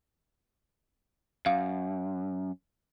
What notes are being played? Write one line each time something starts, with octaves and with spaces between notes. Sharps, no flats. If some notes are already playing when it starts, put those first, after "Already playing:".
F#2 F5